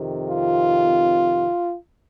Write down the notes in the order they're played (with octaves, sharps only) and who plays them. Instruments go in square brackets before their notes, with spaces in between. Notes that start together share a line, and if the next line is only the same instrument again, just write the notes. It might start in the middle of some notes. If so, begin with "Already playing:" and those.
Already playing: [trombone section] F2 C3 D#3
F4